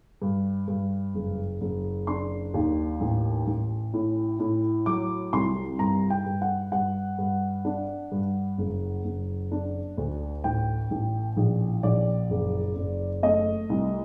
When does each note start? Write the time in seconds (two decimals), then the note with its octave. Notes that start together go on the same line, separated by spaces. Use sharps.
0.22 G2
0.68 G2
1.15 F#1
1.61 F#1
2.07 D4 C6
2.54 D#2
3.00 A1
3.47 A1
3.93 A2
4.39 A2
4.86 F#3 D6
5.33 C2 C6
5.79 G2 A#5
6.10 G5
6.26 G2
6.42 F#5
6.72 G2 F#5
7.18 G2
7.65 D4
8.12 G2
8.58 F#1
9.05 F#1
9.52 D4
9.98 D2
10.44 A1 G5
10.91 A1
11.37 A#1
11.83 A#1 D5
12.30 F#1
12.76 F#1
13.23 A3 D#5
13.69 C2